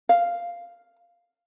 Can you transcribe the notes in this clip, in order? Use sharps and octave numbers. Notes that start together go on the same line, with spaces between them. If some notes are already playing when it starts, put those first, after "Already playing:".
F5